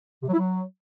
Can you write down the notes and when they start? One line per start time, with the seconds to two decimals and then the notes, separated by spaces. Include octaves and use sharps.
0.23 C3
0.28 F#3
0.33 E4
0.38 F#3